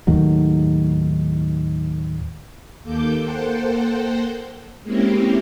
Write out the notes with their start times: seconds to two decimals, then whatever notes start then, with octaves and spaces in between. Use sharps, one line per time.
0.07 D#2 A2 D#3 F#3
2.83 D#2 A#3 A4 D6 G6
3.22 A#3 A4 C5 F#5 G5
4.83 G#3 A#3 C4 C#4 E4 G4